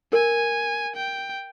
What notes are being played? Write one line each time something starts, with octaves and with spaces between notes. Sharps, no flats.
A#4 G#5
G5